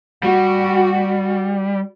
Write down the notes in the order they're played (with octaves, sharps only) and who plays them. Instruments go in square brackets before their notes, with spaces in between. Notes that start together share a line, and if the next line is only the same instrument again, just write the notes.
[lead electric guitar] G3 [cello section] F#4